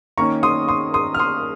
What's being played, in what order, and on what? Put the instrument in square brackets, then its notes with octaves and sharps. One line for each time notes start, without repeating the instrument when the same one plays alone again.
[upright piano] D#3 A#3 C#4 A#5 C#6
C6 D#6
C6 D#6
C6 D#6
F6
C6 D#6